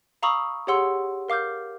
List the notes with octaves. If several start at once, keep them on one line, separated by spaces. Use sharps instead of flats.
F5 A#5 B5 C#6 D#6 E6
G4 G#4 C#5 F#5 C6 E6
A#4 F5 D6 F6 G6